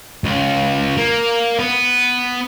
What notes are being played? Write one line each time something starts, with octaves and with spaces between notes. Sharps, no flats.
C#2
A#3
B3